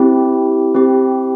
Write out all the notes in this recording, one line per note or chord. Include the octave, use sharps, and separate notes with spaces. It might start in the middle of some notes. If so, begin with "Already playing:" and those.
Already playing: C4 E4 G4
C4 E4 G4